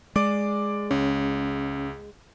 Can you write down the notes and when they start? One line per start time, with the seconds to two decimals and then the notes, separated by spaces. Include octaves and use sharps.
0.16 G#3 D5 D6
0.91 C#2 C#4